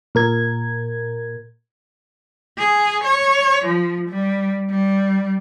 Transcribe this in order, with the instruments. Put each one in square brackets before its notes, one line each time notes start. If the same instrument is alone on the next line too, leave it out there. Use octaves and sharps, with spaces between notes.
[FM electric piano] A#2 A#4 G#6
[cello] G#4
C#5
F3
G3
G3